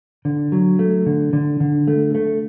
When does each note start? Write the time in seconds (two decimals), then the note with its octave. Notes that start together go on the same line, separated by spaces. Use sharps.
0.25 D3
0.52 F#3
0.79 A3
1.06 D3
1.33 D3
1.60 D3
1.88 A3
2.15 A3